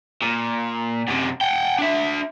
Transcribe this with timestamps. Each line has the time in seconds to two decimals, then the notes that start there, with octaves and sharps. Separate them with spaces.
0.22 A#2
1.08 F#2 C3
1.41 F#5 G5
1.78 D4 E5